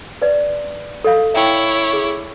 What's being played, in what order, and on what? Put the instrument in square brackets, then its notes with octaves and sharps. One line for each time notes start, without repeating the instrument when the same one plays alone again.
[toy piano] B4 D5
A4 D#5 F5
[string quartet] E4 C#5 [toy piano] E5 G5 A5
[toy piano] G#4